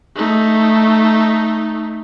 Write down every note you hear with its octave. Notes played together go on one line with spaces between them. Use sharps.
A3 D#4